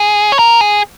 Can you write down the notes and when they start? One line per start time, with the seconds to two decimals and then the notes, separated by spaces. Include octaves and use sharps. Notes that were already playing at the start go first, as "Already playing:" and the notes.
Already playing: G#4
0.32 C#5
0.39 A#4
0.61 G#4